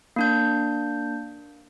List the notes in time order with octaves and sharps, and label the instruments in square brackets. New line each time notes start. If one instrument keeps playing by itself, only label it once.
[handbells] A#3 D4 G6